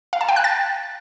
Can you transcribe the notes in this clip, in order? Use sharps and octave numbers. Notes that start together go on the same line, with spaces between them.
F5
A5
G5
F#6
A6